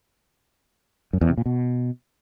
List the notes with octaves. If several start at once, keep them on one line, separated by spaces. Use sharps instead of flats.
F#2
E2
C3
A#2
B2